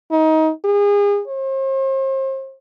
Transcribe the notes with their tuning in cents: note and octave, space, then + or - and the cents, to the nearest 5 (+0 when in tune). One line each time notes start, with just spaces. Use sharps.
D#4 +25
G#4 -35
C5 +40